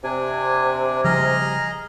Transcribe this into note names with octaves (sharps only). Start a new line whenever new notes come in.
C3 D4 G#5
C#3 F3 G3 G#4 D#5 A#5 F6